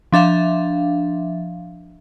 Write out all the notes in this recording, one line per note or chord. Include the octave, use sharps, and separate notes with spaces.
F3 D4 E5 F5